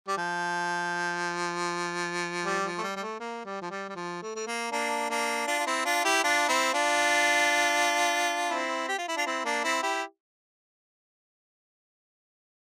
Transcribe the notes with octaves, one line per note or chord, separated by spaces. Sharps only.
G3
F3
G3
F3
A3
G3
G3
A3
A#3
G3
F3
G3
G3
F3
A3
A3
A#3
A#3 D4
A#3 D4
D4 F4
F4
C4 E4
D4 F4
E4 G4
D4 F4
C4 E4
D4 F4
C4 E4
G4
F4
E4
D4 F4
C4 E4
A#3 D4
C4 E4
E4 G4